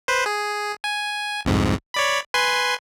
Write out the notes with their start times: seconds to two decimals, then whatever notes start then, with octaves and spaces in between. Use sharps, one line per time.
0.08 B4 C5
0.26 G#4
0.84 G#5
1.45 C2 F2 G#2
1.94 C#5 D5 B5
2.34 B4 G#5 C6